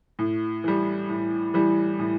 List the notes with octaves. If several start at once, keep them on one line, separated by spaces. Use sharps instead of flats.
A2
E3 G3
A2
E3 G3
A2